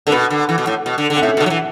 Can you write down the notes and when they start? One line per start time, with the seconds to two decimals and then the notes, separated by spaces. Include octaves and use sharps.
0.07 D3 A4
0.12 B2 B4
0.30 D3
0.49 E3
0.58 B2
0.67 A2
0.86 B2
0.98 D3
1.10 D3
1.17 F#5
1.22 A2 E5
1.37 B2
1.40 D3
1.46 F#3
1.50 E3